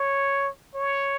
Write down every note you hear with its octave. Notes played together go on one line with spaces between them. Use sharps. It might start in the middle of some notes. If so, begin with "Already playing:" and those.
Already playing: C#5
C#5